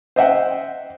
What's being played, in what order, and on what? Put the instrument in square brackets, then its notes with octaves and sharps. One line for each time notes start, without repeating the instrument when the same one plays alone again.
[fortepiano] C5 D#5 E5 F#5 G5